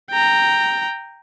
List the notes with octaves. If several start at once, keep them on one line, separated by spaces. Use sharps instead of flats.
G5 A#5